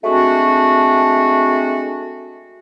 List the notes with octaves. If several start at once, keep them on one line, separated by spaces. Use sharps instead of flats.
G#3 A3 C4 D4 F#4